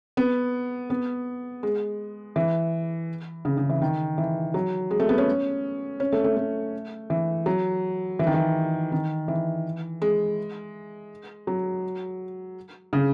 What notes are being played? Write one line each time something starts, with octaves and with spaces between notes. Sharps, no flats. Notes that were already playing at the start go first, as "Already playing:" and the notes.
B3
B3
G#3
E3
C#3
C#3
E3
D#3
E3
F#3
G#3
A3
B3
C#4
C#4
A3
A3
A3
E3
F#3
E3
D#3
E3
D#3
E3
G#3
F#3
C#3